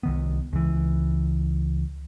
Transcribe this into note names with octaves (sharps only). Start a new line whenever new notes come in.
C2 D#3 B3
C#2 E3